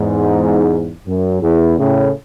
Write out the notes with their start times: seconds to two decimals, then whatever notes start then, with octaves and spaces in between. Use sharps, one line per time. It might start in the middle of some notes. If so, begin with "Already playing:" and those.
Already playing: E2 G#2
1.07 F#2
1.42 E2
1.78 A2 C#3